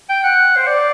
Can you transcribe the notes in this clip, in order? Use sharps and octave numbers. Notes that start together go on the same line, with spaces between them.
G5
F#5
C5
D5